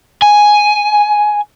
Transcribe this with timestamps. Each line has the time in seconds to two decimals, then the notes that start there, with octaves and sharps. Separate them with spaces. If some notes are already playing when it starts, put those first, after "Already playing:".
0.22 G#5